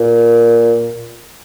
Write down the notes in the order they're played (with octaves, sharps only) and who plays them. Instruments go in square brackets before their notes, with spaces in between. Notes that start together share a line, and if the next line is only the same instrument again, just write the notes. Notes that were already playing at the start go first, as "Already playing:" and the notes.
Already playing: [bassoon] A#2